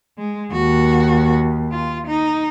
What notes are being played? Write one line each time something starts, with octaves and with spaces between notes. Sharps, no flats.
G#3
D#2 F#4
F4
D#4